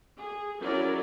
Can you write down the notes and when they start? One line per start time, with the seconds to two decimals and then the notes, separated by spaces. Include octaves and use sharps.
0.18 G#4
0.63 F#3 C#4 E4 A#4 D5